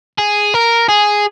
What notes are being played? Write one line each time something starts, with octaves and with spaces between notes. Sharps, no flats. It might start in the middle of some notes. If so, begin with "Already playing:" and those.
G#4
A#4
G#4